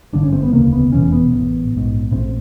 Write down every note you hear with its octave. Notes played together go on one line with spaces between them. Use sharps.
G#1 G2 D3 D4
C#4
C4
B3
E1 D2 C#3 A#3
B3
F1 E2 B2 C#4
B3
A1 A2
A#1 G#2
A#1 A2 C4